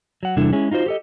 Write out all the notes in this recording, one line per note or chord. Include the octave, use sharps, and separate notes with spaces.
F#3 F#5
E2 C3 G3 D4 E4 A4
G#3 C#4 E4 G#4
D#4 F4 F#4 C5
G4 A4 D#5